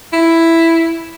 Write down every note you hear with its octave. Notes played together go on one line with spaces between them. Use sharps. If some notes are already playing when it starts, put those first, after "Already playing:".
E4